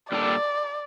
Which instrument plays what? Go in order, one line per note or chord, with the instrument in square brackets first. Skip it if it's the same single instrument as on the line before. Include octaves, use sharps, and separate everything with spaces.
[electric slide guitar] A#2 G3 D4 A4 [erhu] D5